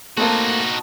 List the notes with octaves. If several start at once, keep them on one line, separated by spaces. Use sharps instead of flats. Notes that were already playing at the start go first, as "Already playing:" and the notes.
A3 A#3 C4 D#4 F#4 G#4 A5